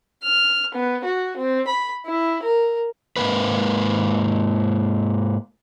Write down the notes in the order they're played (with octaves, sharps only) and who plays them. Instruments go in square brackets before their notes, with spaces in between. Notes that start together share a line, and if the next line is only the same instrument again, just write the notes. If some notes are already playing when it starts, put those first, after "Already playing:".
[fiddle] F6
B3
F#4
C4
B5
E4
A#4
[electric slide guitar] G#2 C#3 A#3 B4